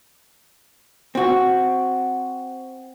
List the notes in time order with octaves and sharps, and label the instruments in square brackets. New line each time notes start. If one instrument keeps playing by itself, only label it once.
[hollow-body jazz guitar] C4 F#4